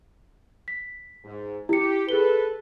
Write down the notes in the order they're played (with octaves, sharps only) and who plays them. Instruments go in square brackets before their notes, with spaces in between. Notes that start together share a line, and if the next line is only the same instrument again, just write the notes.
[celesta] B6
[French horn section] G#2
[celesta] E4 C#7 [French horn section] G4
[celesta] G#4 G7 [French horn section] A4 B4